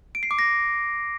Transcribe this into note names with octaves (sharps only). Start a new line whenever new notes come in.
D7
C7
D6
A#6